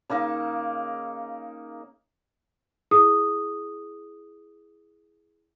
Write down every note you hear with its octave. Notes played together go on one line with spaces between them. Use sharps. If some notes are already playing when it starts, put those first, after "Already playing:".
C#3 A#3 D#4
E4 G#4 D#6